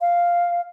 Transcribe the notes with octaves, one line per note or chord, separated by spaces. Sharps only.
F5